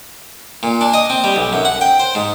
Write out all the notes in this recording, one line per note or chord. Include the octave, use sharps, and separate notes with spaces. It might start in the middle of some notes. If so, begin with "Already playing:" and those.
A#2
D4
D#5
C4
G3
B1
F#2
F#5
G5
C5
G#2